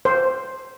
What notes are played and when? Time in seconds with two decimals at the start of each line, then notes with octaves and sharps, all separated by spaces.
0.05 C5